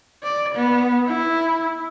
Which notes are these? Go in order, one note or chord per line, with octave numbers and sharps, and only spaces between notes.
D5
B3
E4